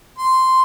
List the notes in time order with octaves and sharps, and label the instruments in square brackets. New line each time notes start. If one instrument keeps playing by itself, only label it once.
[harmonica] C6